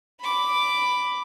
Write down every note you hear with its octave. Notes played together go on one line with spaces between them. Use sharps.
B5 D6